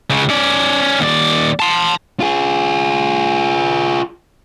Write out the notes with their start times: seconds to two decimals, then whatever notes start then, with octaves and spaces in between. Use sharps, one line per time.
0.10 C#2 C#3
0.30 C#4 D5
1.00 D#2 D5
1.60 A5 C6
2.20 F4 G#4